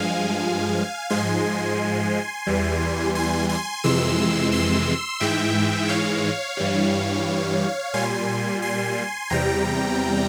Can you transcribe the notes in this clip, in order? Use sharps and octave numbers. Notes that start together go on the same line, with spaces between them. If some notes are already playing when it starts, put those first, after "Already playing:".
Already playing: G2 F3 G#3 F5 G#5
G#2 F3 G#3 G#5 C6
E2 E3 G3
G#5 C6
G#5 C6
F2 C3 E3 G#3 C6 E6
C6 E6
G#2 E3 G#3 E5 G5
C#5 F5
G2 E3 G3
A#2 G3 G#5 C6
G#5 C6
E2 C3 G3 G5 A#5